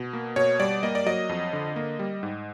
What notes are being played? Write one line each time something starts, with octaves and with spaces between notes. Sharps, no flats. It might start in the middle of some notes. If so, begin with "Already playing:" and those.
Already playing: B2
A#3
B2 C#5
G3 D5
A#3 D#5
D5
F#3 D#5
F2
D3
A#3
G3
G#2